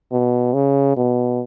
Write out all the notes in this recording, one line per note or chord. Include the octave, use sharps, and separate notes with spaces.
B2
C#3
B2